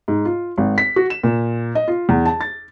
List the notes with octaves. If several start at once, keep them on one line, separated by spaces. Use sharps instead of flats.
G#2
F4
G#1
B6
F#4
E7
A#2
D#5
F4
E2
A5
A6